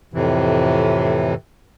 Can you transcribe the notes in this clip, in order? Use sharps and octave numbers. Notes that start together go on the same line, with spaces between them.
F2 A2 C3 E3